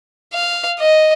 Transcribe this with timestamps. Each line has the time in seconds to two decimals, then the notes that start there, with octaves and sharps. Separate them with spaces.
0.34 F5
0.80 D#5